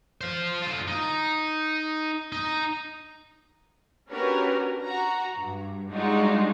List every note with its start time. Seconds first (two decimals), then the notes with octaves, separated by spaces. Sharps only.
0.21 C5 F5
0.62 D3 F4
0.88 D#4
2.33 D#4
4.09 C#4 D4 F#4 G4 A#4 B4
4.84 F#4 A#5
5.37 G2
5.91 G3 G#3 D4 D#4 F4 F#4